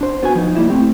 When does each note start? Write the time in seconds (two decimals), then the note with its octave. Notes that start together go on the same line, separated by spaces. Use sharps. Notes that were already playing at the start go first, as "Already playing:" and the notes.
0.01 D4 C5
0.23 B3 F#4 B4 G#5
0.35 F3 D#4
0.55 G3 A#3 E4 E5
0.70 A3 C4 G4